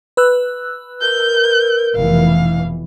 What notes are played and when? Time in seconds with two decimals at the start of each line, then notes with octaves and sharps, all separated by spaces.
0.17 B4 E6 F#6
1.02 A#4 G6
1.96 F1 B2 E3 F5